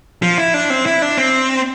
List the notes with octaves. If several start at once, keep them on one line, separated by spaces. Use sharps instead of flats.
F3
E4
D4
C4
E4
D4
C4